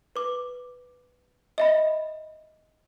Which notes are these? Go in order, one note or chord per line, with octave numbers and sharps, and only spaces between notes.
B4 D6
D#5 E5 B5